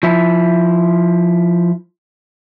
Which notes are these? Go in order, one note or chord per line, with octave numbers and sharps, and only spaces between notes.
F3 E4